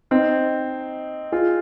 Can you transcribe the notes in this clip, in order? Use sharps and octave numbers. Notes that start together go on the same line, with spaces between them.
C4 D#4
F4 G#4